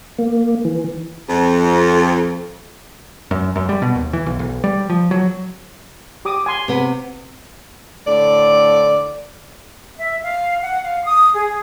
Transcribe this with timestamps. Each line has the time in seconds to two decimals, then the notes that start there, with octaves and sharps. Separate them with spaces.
0.19 A#3
0.65 E3
1.29 F2
3.31 F#2
3.56 F#2
3.69 G3
3.82 B2
3.95 D#2
4.13 E3
4.26 B1
4.39 B1
4.64 G3
4.90 F3
5.11 F#3
6.25 G4 D6 D#6
6.46 G#5 C6
6.68 C3 B3
8.06 A2 D3 D5
9.97 E5
10.22 F5
10.62 F#5
10.83 F5
11.04 D#6
11.34 G#4